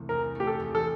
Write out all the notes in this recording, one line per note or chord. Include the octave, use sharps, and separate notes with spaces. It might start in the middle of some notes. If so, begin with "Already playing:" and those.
Already playing: E1 C2 A3
E2 A#4
A3 G4
A4
E2
A4